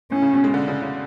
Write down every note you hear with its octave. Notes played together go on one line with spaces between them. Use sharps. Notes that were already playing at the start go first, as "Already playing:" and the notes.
A2 C#4
C#3
B2
G#3
D3
C#3
C#3